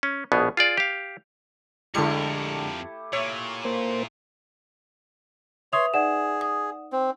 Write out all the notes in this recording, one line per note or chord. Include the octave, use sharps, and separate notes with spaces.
C#4
A#1 B2 B3 G#4
F4 G#4 D5
G4 F5
F2 D3 G#3 A3 E4 G4 A#4 C#7
A#2 C#5 E5
A#3 C5
B4 C#5 E5 C6 D#6 F7
D#4 G#4 D5 F#5 E7
D#6
C4